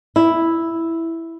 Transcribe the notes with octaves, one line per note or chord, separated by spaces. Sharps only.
E4